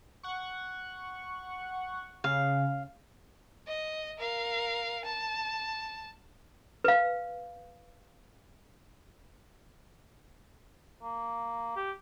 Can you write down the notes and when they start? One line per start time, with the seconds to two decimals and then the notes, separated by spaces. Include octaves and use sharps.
0.23 F#5 C#6
2.24 C#3 F5
3.68 D#5
4.18 A#4 F5
5.06 A5
6.84 B4 F5
11.02 A#3
11.76 G4